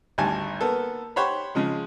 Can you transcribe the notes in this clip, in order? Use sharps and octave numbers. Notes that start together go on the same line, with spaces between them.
G#1 D2 G3 G#5 A5
A#3 B3 A4
G4 C5 C#5 F#5 B5
C#3 F3 G#3